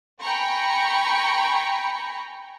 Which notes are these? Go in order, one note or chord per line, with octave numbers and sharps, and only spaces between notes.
G5 G#5 A#5 B5 C#6